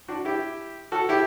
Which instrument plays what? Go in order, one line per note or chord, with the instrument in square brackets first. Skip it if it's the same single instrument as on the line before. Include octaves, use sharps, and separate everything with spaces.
[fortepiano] D4 F#4
E4 G4
F#4 A4
E4 G4